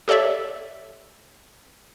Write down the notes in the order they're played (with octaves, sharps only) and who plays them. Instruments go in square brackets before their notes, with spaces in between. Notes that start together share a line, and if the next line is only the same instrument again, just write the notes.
[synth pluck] G4 A4 C#5 D5 E5